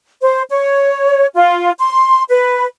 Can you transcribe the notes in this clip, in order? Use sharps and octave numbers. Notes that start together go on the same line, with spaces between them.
C5
C#5
F4
C6
B4